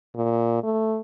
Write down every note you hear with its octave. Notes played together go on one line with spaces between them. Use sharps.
A#2
A3